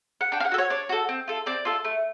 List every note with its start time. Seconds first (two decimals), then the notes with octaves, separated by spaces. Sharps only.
0.21 F#5
0.32 D4 G5
0.40 F5
0.45 F#5
0.52 F#4 A4
0.58 C#5
0.70 D4 C#5
0.89 F#4 A4
1.09 C4
1.28 F4 A4
1.46 C4 D5
1.65 F4 A4
1.84 A3